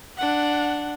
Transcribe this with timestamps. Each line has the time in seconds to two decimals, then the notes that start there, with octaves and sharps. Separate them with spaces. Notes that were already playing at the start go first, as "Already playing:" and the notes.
0.17 D4 F#5